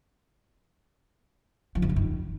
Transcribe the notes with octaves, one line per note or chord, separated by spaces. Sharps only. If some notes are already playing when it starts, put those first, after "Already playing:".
F3
F2
F#2
D#3